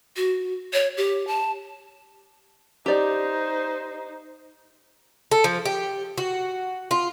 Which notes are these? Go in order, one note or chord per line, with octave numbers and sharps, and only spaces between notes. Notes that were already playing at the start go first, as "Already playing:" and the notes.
F#4
C#5
G4
A5
D#4 G4 C5 D5
A4
F3
G4
F#4
F4